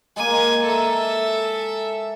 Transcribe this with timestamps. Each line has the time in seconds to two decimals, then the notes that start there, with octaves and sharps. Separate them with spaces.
0.16 G#3 A#3 G#5
0.63 A4 E5 A#5